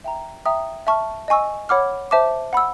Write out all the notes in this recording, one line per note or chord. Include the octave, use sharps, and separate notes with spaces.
E5 G5 A#5
E5 G5 A#5 D#6
E5 A5 C#6 F6
D#5 G#5 C#6 E6
C#5 F#5 B5 D6 F6
C5 E5 A5 D6
F#5 B5 E6